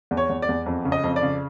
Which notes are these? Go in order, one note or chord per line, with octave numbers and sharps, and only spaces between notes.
E2
C#5
E2
D5
E2
F2
C#3
D#5
F2
D5
C#3